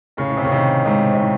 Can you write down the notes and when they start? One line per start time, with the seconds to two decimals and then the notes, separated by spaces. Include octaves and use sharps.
0.17 A2 C#3
0.30 A2
0.37 C3
0.45 C#3
0.51 C3 D#3
0.85 G#2 C3
1.14 C3
1.19 A2